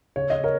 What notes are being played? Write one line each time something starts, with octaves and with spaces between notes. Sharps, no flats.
C#3 C#5
D#5
A#4 C#5